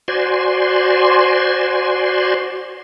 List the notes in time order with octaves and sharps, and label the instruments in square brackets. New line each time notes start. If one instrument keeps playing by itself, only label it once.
[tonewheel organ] F#4 C5 D5 G#5 C6